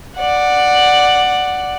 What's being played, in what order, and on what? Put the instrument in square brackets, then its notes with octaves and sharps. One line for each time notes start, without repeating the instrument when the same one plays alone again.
[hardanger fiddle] D5 F#5